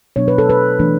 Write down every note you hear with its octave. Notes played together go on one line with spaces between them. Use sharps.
B2 F#3 B3 D4 C#5
B4
A4
B4
E3 A3 D4